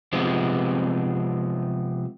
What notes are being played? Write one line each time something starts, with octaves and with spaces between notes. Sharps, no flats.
C3 F3 G#3 B3 C4